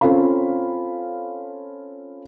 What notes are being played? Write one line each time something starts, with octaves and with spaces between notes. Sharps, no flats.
C4 C#4 F4 A4 F5 B5